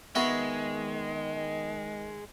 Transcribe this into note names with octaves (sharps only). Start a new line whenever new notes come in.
D#3 G#3 B3 F#4 E5